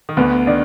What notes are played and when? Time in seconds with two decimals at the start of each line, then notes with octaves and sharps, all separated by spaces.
0.09 D#3
0.17 D2 D3 B3
0.47 D#3 D4